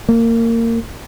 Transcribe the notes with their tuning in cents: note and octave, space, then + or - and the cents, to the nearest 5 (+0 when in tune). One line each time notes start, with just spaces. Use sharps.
A#3 -25